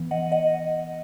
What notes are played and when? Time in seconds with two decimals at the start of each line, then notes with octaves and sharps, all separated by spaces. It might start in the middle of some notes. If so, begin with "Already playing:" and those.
Already playing: E3 B3
0.11 D#5 F#5
0.32 D#5 F#5